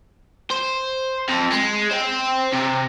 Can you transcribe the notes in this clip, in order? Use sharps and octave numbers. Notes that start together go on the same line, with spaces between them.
C5
F2
G#3
C5 G5
C3